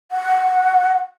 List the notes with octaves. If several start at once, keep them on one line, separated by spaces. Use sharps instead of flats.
F#5